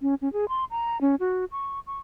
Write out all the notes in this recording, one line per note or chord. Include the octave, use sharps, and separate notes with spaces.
C#4
C#4
G#4
C6
A#5
C#4
F#4
C#6
C#6